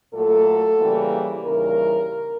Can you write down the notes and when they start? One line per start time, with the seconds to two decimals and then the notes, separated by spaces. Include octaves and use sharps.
0.13 A#2 F#3 A3 A4
0.79 C#3 E3 G3 A#3
1.44 D#2 C#3 E3 G3 A#4